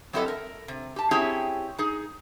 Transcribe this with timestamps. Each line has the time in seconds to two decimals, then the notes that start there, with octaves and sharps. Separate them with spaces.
0.13 F#3 C4 E4 G4 A4 D#5
0.28 A#4
0.68 C3
0.96 G4 A5
1.11 C4 C#4 E4 G4 G#4
1.78 D#4 G#4